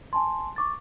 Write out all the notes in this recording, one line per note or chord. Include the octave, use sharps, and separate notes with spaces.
G#5 A5 C6
C#6 D6 A6